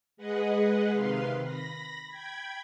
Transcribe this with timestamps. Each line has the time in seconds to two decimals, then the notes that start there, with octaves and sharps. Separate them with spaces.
0.17 G#3 G#4 B4 D#5 F#5
0.92 C3 D#3 B4 F5 C6
1.43 B5 A#6
2.09 G5 B5 G#6